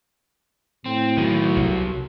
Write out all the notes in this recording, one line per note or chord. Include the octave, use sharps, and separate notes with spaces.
A2 C4
B2 D#3 F#3
C2